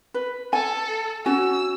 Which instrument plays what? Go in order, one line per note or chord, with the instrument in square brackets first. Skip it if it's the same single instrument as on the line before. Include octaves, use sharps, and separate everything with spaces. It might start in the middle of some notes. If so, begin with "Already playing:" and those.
[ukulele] B4
[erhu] A4 [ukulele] G#5
[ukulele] C#4 F#4 G#5 [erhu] E6